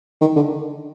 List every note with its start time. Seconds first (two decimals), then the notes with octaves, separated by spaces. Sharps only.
0.21 D#3
0.36 D3